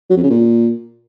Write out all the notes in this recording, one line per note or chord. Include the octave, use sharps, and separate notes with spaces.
F#3
F2
C#3
A#2